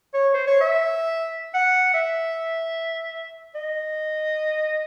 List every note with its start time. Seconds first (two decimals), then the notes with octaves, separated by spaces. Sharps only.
0.14 C#5
0.34 C5
0.47 C#5
0.61 E5
1.54 F#5
1.94 E5
3.55 D#5